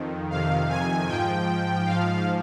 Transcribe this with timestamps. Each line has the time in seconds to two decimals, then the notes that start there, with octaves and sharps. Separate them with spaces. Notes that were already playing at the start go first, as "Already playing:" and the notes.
Already playing: F2 D#3
0.30 F2 C3 D#3 F5
0.69 G#5
1.08 G#2 F3 G5
1.86 G#2 F3 F5